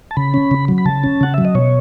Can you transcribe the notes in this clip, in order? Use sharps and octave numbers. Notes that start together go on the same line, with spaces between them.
A5
C#3 B5
C#4
C#3
F#3
B5
C#3 A5
C#4
C#3 F#5
F#3 E5
D#5
B2 C#5